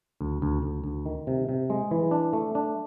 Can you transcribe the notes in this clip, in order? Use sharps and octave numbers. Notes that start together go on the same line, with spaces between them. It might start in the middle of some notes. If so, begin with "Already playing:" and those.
D2
D2
D2
D2
D#3
C3
C3
G#3
E3
D4
A3
D4